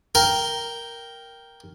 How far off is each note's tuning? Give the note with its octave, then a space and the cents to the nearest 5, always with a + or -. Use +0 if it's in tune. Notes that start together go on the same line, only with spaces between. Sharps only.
A#4 +0 G5 +0